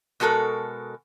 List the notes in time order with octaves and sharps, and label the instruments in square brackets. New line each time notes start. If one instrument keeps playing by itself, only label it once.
[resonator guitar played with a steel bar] B2 G#3 F#4 A4 A#4